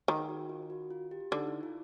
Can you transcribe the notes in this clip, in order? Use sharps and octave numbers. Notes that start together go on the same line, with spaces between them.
D#3 G#4
F#4
F4
F#4
F4
G4
D3 D#4
E4
F4